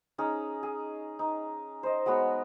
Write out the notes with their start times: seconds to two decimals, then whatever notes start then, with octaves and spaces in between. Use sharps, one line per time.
0.18 C#4 D#4 G#4
0.63 G#4
1.19 D#4
1.83 C5 D#5
2.06 F#3 G#3 B3 F#4